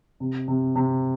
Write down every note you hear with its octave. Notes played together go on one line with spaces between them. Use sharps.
C3
C3
C3